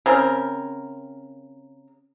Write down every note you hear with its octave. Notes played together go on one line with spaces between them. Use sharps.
C#3 C4 A#4